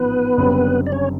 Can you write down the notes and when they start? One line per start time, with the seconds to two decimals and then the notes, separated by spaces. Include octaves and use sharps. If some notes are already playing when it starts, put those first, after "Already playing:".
Already playing: A1 G#2 F3 B3 B4
0.37 F#1 F#2 D3 G3 C4
0.86 D5
0.92 C#4 C#5